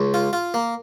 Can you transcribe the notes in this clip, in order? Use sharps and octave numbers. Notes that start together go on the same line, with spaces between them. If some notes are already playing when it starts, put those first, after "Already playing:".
Already playing: C#2
F4
F4
A#3